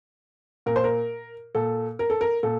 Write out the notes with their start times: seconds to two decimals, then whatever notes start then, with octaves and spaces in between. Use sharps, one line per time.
0.66 A#2 A#4
0.76 C5
0.84 A#4
1.55 A#2 A4
1.99 A#4
2.10 A4
2.21 A#4
2.43 A#2 A4